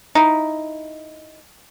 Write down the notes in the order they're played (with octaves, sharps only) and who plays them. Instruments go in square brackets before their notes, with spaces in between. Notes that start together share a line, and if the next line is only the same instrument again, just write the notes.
[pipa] D#4 E4